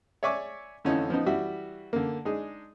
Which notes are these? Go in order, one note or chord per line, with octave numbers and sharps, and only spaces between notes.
C#5 D5 E5 G#5 C#6 D6
F2 D3 E3 A3 C#4 D#4
F3 B3 D#4
E3 G3 F#4 E5
D3 A#3
G#3 D4 D#4 G#4